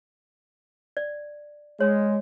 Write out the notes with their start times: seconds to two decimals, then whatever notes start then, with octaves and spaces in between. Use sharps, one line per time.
0.97 D5
1.80 G#3 C#5